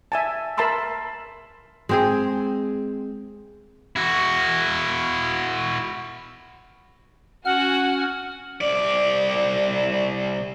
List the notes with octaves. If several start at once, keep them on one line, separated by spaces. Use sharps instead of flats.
E5 G#5 A5
A#4 E5 A5 B5 C6 E6
G#3 C4 G#4
E4 F#4
C#4 F#4 F#5 G#5 F6
C2 D5